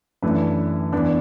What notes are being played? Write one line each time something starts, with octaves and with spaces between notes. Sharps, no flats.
F#2 E3 A3 D4 B4
E2 E3 B3 D4